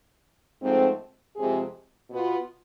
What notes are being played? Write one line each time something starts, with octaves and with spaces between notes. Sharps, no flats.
G#2 F3 A3 C4
F2 C3 G#3 C4 G#4
B2 B3 F4 B4